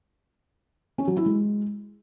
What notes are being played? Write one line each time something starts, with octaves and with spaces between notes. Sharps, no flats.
C#4
F#3
E4
G#3